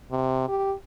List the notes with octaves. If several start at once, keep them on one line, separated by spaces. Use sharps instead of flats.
C3
G4